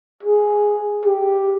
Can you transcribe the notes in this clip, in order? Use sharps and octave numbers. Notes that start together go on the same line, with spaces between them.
G#4
G4